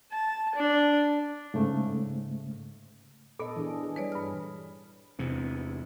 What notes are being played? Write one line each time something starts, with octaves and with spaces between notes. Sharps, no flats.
A5
D4
G#2 C#3 A3
A#2 B3 A4 D#5
E3 D4 G#4
G#4
E3 G3 B4 C#5 D5
G2 F6
E2 C3